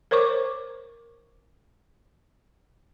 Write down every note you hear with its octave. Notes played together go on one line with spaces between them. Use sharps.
A#4 C5 C#5 C#6 D6